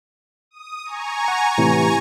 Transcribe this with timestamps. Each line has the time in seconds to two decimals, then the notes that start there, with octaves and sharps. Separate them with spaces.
0.51 D#6
0.84 G#5 A#5 C#6
1.28 F#5
1.58 A2 C3 E3